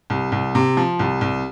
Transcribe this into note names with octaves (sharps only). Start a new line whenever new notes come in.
C2
C2
C3
F3
C2
C2